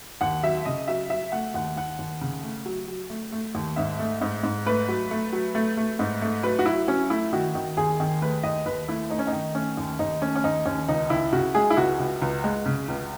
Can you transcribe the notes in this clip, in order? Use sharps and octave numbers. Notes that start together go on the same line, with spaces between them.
D#2 F#5
F#3 E5
C#3 D#5
F#3 E5
F#3 E5
A3 F#5
D#2 F#5
D#2 F#5
D#2
C#3
A3
F#3
F#3
A3
A3
D#2
G#2 E5
A3
G#2
G#2
A3 B4
F#3
A3
F#3
A3
A3
G#2
A3
F#3 B4
F#4
F#3 E4
F#3 C#4
A3 E4
D#3 F#4
D#3
D#2 G#4
D#3
A3 B4
D#2 D#5
D#2 B4
A3 E4
A3 D#4
C#4
D#4
D#3
A3 C#4
D#2
D#2 D#4
A3 C#4
C#4
D#2 D#4
D#2 C#4
C#2 D#4
C#2 E4
C#3 F#4
G#3 G#4
E4
C#2 F#4
C#2
C#2
G#3
C#3
C#2